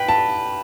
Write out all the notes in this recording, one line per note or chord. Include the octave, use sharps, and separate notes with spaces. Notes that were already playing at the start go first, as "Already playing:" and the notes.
Already playing: B4 G5
A5